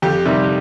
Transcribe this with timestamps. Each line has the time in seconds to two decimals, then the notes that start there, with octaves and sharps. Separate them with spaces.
0.02 F2 G4
0.25 C3 D#3 G3